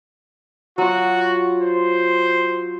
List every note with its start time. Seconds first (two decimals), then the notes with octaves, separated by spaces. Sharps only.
0.78 F#3 F4 F#4
1.61 C5